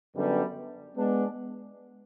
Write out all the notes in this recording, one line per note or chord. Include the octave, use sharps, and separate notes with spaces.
F#2 D3 G3 B3
G#3 B3 D4